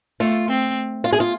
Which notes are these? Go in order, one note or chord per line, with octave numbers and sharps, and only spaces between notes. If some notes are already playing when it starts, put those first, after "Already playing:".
A3 F4
C4
F4
G#4
F4